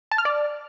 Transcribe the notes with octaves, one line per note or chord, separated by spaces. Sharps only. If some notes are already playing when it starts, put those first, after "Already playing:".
A5
F6
D5